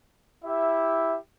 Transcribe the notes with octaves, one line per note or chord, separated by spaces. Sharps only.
E4 G4 E5